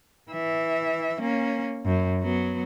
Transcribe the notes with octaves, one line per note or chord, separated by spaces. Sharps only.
E3 E5
A#3 C#4
F#2
F#3 B3